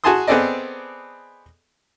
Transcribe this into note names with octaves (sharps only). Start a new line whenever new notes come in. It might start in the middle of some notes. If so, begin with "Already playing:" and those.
F#4 G#4 G#5 A5 C6 D#6
B3 C4 G#4 A4 D5 D#5